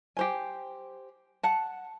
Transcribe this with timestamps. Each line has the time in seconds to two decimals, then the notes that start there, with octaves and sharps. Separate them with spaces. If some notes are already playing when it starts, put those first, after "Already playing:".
0.17 G4 C5 G#5
1.43 F#5 A5